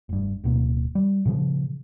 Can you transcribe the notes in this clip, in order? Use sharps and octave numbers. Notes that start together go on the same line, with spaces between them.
F1 G2
D1 B2 A#3
G3
A#2 C#3 F3